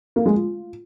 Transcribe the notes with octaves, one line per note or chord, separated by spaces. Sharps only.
A#3
G#3
F4